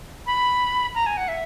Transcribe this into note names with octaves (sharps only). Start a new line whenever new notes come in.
B5
A#5
G#5
F#5
E5